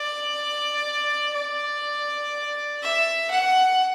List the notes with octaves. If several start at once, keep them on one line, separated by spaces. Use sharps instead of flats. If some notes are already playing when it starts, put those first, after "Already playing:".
Already playing: D5
D5
E5
F#5